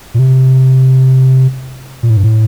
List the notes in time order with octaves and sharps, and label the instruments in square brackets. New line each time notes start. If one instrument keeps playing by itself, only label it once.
[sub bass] A#2
C3
A#2
A2
G2
A2